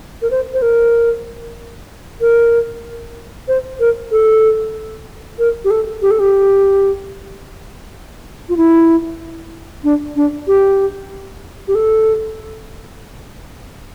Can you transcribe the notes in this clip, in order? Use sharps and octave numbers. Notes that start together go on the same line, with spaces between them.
A#4
C5
C5
A#4
A#4
C5
A#4
A4
A#4
G4
A4
G4
A4
G4
F4
E4
D4
D4
G4
G4
A4